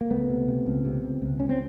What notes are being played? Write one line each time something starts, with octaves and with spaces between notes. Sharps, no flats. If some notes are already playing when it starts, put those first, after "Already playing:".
A#3
C#2 A3 B3
C3
C3
C#2
C3
C#2
C#2
C#2 C#4
C4